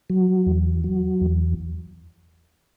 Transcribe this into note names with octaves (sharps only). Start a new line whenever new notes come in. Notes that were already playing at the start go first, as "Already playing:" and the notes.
F#3
E2
F#3
E2